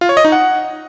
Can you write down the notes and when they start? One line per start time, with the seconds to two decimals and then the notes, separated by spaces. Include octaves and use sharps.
0.01 F4
0.09 C#5
0.17 D#5
0.25 D#4
0.32 F#5